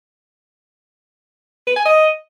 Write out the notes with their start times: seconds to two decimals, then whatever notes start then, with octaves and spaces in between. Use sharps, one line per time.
1.67 B4
1.76 G#5
1.85 D#5